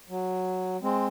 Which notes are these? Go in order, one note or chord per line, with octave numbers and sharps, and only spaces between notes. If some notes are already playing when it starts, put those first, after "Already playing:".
F#3
G#3 C4